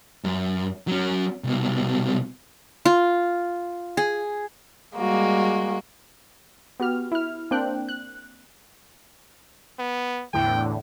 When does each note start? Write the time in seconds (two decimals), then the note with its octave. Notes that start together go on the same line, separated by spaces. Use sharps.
0.24 F#2
0.88 F#3 C#4
1.44 C2 B2
2.85 F4
3.97 G#4
4.96 G3 G#3 A#3 F#4
6.80 B3 F#4 G4 F6
7.12 E4 F6
7.51 A#3 C4 D4 G5 F#6
7.89 F#6
9.79 B3
10.34 E2 A2 D3 G5